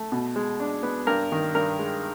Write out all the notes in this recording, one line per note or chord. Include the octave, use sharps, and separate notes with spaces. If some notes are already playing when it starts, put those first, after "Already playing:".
Already playing: A3
B2
G#3
D4
B3
G2 A#4
D#3
G2 A#4
G#3